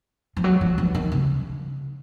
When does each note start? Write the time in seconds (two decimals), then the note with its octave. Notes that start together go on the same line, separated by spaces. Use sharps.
0.37 F3
0.44 F#3
0.61 F3
0.78 E3
0.95 D#3
1.12 C#3